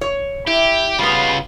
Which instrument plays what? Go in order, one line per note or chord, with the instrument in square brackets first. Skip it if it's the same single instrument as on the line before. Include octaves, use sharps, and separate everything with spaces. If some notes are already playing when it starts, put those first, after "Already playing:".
[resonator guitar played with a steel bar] C#5
[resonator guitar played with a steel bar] E4 [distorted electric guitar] G4
[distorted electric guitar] C#3 F4 [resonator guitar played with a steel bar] G3 B3